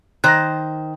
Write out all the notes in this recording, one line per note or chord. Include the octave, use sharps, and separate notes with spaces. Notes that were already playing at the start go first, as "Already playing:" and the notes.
D#3 C5 F#6 A#6